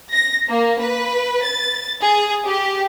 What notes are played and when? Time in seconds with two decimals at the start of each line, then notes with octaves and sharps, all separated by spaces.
0.11 A#6
0.47 A#3
0.79 B4
1.43 A6
2.01 G#4
2.45 G4